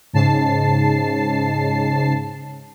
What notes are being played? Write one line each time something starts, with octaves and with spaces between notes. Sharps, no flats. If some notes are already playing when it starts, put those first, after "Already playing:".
G#2 C#3 A5 C7